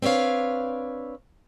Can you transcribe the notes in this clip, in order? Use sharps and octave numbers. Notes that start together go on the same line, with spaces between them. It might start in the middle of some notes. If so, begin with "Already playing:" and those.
C4 D4 B4 C#5 F5